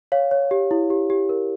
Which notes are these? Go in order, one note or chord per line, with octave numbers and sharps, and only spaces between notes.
C#5 F5
C#5
G4
E4
G4
G4
A#4